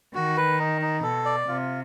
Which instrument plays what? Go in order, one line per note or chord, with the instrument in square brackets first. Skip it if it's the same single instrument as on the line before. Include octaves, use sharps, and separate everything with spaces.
[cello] D#3 [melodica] F#4
[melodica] B4
D#4
D#4
[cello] B2 [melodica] A4
[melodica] D5
[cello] C3 [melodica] F4